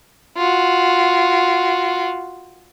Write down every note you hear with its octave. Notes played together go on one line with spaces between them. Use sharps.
F4 F#4